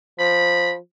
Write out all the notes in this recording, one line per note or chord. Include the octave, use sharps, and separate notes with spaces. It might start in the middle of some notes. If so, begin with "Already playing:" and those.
F3 B5